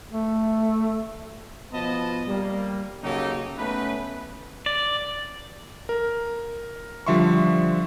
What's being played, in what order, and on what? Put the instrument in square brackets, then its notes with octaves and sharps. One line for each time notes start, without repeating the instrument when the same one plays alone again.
[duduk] A3
[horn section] B2 F3 B3 D#5 A5 B5
G3 A#3
C#3 F#3 A#3 D#4 G4 A4
A3 B3 C#4 D#4 B4
[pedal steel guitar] D5
[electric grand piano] A#4
D3 F3 G3 E5 C6 C#6